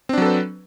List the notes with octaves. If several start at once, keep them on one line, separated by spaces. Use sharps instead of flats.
F#3 C4 D4 A4 B4